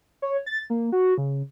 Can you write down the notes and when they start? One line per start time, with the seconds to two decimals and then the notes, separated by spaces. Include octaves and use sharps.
0.22 C#5
0.46 A6
0.70 A#3
0.92 F#4
1.18 C#3